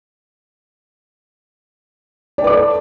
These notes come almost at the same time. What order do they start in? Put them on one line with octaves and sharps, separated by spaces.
D5 G5 B4 D6 A4